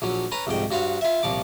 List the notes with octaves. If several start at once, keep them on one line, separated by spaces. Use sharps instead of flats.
A#1 F#3 C#4
C#4 B4 A#5
C2 F2 G#2 G5
G2 F#4 C5 F5
F4 E5
C2 A#2 F3 D6